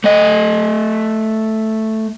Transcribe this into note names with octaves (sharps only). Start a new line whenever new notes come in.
A3 D#5